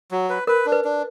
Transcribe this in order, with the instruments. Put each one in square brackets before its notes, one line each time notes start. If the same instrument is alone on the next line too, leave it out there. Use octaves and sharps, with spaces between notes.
[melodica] F#3
B4
[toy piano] A#4 [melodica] B4
[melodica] D4
[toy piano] B4
[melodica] D4